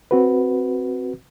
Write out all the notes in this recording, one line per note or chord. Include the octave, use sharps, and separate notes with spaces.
C4 F#4 B4